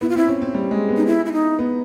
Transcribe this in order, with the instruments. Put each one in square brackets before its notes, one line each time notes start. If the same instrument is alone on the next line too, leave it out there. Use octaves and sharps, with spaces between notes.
[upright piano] B3 [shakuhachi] E4
[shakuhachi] F4
[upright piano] C4 [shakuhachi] E4
[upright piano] C#4
C4
G3
G#3
B3
[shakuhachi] D#4
E4
E4
D#4
[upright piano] B3